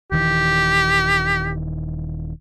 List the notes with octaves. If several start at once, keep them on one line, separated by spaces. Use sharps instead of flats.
D#1 D#3 E3 G4